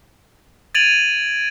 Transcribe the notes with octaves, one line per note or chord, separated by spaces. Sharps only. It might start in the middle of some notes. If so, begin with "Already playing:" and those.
G#6 A6 D7 D#7 F7 F#7